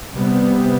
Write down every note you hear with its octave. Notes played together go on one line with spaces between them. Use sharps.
C3 G3 B3